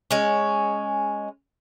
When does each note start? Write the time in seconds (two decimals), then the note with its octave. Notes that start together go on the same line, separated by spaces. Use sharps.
0.11 G#3 C#4